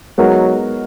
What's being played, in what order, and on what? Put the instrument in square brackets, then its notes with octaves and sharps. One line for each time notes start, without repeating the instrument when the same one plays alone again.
[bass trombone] F#3 [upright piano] G#3 B3 D#4 F#4 A#4